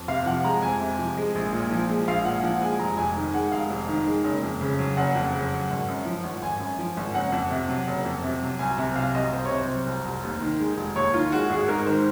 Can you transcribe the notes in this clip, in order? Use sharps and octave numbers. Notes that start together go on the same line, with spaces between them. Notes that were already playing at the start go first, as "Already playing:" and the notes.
Already playing: F2
C3 F5
F3 F#5
G#3 A#5
F2 G#5
C3
F3
G#3
A#1
A#2
F3
G#3
A#1 F5
A#2 F#5
F3 F#5
G#3 G#5
F1 A#5
F2 G#5
D#3 G#5
G#3 F#5
F1 F5
F2
D#3
G#3
F#1
F2
C#3
F#3
F#1 F#5
F2
C#3
F#3
G#1
F#2
F3
G#1
G#1 G#5
F#2
F3
G#1
F#1 F#5
F2
C3
F#3
F#1
F2
C3
F#3
C2 G#5
C3
F#3 F5
C2 D#5
C2 C5
C#5
C3
C5
F#3
C2
F1
D#2
D#3
G#3
F1
D#2 C#5
D#3 F4
G#3 F#4
G#1 G#4
G#2 A#4
D#3 C5